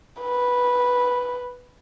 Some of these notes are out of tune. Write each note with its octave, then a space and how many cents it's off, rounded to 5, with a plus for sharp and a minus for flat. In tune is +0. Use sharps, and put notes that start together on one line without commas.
B4 -5